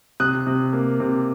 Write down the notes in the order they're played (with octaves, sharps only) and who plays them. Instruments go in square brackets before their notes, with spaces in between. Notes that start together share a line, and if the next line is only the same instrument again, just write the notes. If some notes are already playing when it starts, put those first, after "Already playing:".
[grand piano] C3 D#6 F#6
C3
A#3
C3